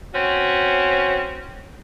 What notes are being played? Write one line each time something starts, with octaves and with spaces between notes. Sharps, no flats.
C4 C#4 F#4